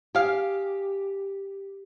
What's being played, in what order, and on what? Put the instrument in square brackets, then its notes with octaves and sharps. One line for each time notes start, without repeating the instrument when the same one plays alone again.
[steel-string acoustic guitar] G4 [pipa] G#4 F5